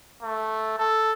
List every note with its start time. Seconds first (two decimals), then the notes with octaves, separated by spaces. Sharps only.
0.23 A3
0.78 A4